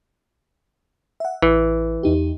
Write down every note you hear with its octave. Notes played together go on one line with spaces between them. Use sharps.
E5 F#5
A1 E3
E2 D#4 G4